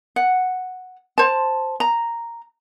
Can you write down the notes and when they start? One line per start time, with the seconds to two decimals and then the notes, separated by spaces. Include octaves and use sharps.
0.16 F#5
1.18 C5 A5
1.80 A#5